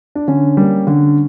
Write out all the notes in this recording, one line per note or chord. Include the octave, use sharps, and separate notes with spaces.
D4
D3 C#4
G3 A#3
D3